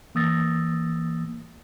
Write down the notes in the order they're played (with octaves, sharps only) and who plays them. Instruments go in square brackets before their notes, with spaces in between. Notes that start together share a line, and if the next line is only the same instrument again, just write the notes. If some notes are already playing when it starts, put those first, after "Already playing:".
[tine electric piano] E3 A#3 D#6 E6 A6 A#6